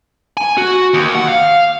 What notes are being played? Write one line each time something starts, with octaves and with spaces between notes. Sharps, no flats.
G#5
F#4
D#2
F#5
F5